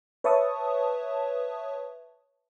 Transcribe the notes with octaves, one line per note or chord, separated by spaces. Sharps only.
B4 C#5 E5 A5 C#6 D#6